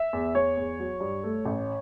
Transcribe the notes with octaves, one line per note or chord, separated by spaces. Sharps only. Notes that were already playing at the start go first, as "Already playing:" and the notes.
Already playing: E5
E2
E2 C#5
E2
F#3
G2
A3
A1